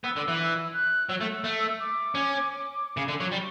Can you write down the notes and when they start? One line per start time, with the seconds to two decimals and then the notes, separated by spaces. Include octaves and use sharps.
0.04 B3 E6
0.16 D3
0.28 E3
0.74 F#6
1.09 F#3 E6
1.21 A3
1.44 A3
1.80 D6
2.15 C#4
2.97 C#3
3.08 D3
3.20 F#3 C#6
3.32 G3